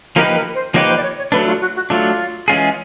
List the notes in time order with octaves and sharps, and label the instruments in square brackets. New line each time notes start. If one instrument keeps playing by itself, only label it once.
[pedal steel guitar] F3 A#3 D#4 G4 B4 [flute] A#4
[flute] A#4
C5
[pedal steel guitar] F3 A#3 D#4 G4 B4 [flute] C#5
[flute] C5
D5
C#5
C#5
[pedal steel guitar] F#3 A3 D4 [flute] B4
[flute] F4
F#4
F#4
[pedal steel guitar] F#3 A3 D4 [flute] F4
[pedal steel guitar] E3 G#3 C#4 F4 G#4